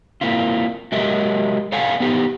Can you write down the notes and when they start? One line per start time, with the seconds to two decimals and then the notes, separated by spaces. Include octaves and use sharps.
0.21 A#3 C4 E4 F4
0.92 F#3 G#3 G4 A#4 D#5 E5
1.72 A4 C5 D5 F5 F#5 G#5
2.00 B3 D#4 G4 C5